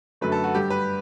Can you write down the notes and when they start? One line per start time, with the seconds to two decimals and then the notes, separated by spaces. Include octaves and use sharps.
0.21 F#2 D3 F#3 A3 B4
0.32 A4
0.44 F#4
0.54 G2 D3 G3 G4
0.70 B4